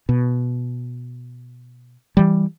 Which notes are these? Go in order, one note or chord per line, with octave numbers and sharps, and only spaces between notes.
B2
E3 G3